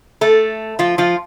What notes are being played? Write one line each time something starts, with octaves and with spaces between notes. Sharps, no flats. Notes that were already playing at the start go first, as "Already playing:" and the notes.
A3 A4
F3 F4
F3 F4